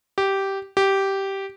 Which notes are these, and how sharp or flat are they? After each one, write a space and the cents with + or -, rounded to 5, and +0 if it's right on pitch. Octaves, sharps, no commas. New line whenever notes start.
G4 -10
G4 -10